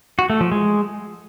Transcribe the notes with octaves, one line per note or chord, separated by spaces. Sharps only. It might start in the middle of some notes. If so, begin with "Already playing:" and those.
F#4
A3
F3
G#3